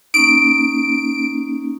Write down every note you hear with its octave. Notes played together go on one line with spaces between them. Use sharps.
A#3 C#4 D#4 D7